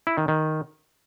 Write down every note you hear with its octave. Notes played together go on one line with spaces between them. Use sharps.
E4
D#3
D#3